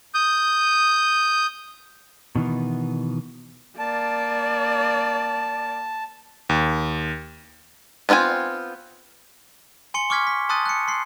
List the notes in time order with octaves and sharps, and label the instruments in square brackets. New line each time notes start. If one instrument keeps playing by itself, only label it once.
[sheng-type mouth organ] D#6 G6
[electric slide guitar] B2 D#3 E3 B3
[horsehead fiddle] A#3 D5 [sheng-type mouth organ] A5
[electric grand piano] D#2
[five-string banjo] B3 C4 F4 F#5 G#5
[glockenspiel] G#5 C6 C#7 G7
C#6 D6 F6 G#6 B6
B6
A5 C6 D#6 F#6 A6 D#7
F#6 C#7
C6 C7